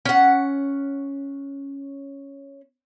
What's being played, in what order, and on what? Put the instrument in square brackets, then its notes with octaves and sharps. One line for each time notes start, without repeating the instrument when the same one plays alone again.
[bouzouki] C#4 F#5